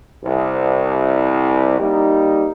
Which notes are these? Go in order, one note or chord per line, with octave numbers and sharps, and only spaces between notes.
C2
G3 A#3 D#4